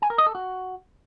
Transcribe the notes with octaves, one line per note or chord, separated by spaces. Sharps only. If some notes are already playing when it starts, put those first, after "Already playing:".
G#5
A#4
D#5
A4
F#4